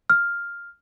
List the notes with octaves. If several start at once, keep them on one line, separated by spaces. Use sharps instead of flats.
F6